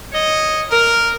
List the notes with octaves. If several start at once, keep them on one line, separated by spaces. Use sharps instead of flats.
C#5 D#5
A#4